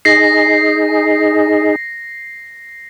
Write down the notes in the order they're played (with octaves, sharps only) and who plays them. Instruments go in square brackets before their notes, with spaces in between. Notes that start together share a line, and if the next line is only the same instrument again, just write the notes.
[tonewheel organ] D#4 G#4 [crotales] A#6 C7